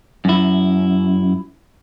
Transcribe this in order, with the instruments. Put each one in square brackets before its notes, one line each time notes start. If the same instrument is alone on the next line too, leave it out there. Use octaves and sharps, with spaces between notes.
[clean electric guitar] F#2 E4